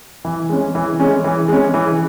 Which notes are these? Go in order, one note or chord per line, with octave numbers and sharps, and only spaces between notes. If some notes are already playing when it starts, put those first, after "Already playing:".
E3
G#3 C#4
E3
G#3 C#4
E3
G#3 C#4
E3